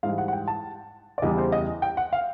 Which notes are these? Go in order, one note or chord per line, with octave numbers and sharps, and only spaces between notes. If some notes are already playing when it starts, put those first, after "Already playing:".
G#2 E3 G3 F5
F#5
F#5
G5
A5
D5
E2 C#3 E3 G3 D#5
C5
D#5
G5
F#5
F5